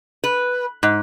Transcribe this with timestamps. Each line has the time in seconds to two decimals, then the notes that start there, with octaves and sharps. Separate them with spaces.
0.24 B4
0.83 G#2